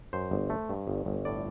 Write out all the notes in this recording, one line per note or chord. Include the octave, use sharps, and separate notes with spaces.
F#2 C5
G1
A3
G2
G1
G1
A2 D5